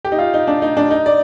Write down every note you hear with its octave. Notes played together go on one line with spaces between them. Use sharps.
G4
D#4
F4
D#4
D4
D#4
D4
D#4
D5